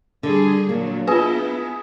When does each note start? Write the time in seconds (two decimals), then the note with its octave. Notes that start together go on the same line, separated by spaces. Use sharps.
0.23 D3 G3 G#4
0.69 A#2 F#3 A#3 D4
1.07 B3 E4 F4 G#4 B4